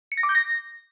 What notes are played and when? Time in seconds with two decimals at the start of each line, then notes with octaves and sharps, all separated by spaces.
0.12 C#7
0.17 A#6
0.23 D6
0.29 G6
0.35 A#6